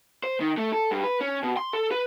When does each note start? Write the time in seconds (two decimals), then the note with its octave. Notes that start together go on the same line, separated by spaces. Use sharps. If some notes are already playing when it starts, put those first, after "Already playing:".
0.24 C5
0.40 D#3
0.57 A3
0.72 A4
0.91 G2
1.04 B4
1.21 C#4
1.43 B2
1.57 C6
1.73 A4
1.91 B4